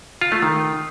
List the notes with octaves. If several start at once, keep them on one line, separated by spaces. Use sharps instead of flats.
F4
A3
D#3